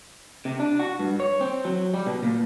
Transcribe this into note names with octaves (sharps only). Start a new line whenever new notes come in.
C3
D4
F#4
G2
C#5
C4
F#3
G3
B2
A#2